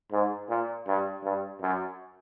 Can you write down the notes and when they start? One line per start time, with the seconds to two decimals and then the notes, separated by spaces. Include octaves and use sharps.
0.12 G#2
0.49 A#2
0.86 G2
1.24 G2
1.61 F#2